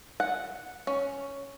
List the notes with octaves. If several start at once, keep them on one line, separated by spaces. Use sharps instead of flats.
F#5
C#4